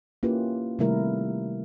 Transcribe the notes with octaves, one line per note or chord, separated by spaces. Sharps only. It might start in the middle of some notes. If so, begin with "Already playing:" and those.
A#3 C#4 E4 F4 G4 B4
C3 D#3 G3 A3 E4 A#4